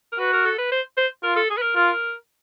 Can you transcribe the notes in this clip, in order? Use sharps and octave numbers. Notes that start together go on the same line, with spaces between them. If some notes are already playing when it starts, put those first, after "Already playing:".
A#4
F#4 B4
A#4
A4
B4
C5
C5
F4 A#4
A4
G#4
B4
A#4
F4 A#4